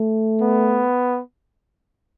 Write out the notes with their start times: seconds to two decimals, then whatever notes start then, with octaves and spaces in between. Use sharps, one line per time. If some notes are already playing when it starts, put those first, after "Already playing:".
Already playing: A3
0.42 B3